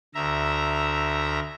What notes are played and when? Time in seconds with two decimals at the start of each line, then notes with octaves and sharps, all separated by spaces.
0.14 D2 E5 A#5